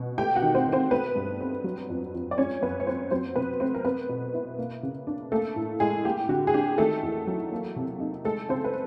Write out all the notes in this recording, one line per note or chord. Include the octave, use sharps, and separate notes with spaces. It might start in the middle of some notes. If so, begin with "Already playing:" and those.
Already playing: B2
A3 G4 G5
F#4 F#5
D#3
C4 C5
D#3
C4 C5
A3 B3 B4
G2
C4
F#3
F2
F2
D5
G#3 C#4 C#5
F#2 B3 B4
C#5
B3 C4 C5
F#3 C4 C5
C3 B3 B4
A3 C4 C5
A#4
B3 C4 B4
B2
E4
A#3
C#3
D4
A3 A#3 A4
A2
A2 G#3 G#4
A#3 G4
D3 F#4
G#4
D4 G4
D#3 A3 A4
E2
F#3
A#3
C3
D#4
G#3 A3 A4
C#3 C4 C5
B4